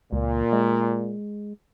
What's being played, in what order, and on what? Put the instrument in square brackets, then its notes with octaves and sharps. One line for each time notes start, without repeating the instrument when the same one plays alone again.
[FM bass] C#2 [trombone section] A#2
[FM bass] G#3